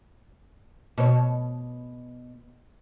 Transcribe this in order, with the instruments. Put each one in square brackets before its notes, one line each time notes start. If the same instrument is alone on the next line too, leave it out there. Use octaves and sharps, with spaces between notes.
[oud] B2 C#5